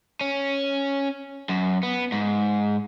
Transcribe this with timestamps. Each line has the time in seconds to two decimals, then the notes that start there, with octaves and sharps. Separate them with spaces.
0.21 C#4
1.49 F#2
1.83 B3
2.12 G#2